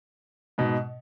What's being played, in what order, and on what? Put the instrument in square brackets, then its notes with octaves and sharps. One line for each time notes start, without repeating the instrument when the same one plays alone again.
[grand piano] G#2 B2